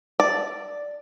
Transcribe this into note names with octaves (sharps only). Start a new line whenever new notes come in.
D5